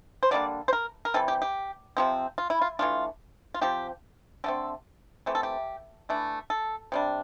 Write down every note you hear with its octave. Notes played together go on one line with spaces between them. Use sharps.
C5
D3 G3 A#3 D4 D5
C5
A#4
A#4
C3 E3 G3 A4
G4
G4
C3 F3 C4
F4
E4
F4
E3 A3 D4 F4
F4
F3 C4 G4
D3 A3 C4 A4
E3 A3 C4 G4
A4
G4
E3 A3 D4
A4
C3 G3 D4